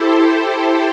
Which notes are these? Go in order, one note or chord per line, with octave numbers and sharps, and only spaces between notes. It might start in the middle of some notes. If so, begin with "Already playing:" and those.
Already playing: E4 G4 A4 C5
E4 A4